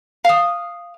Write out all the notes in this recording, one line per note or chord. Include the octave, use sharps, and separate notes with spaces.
F5 D#6